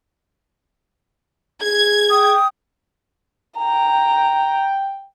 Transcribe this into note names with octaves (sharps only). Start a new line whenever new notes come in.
G#4 G#6
G5 D#6
G5 A#5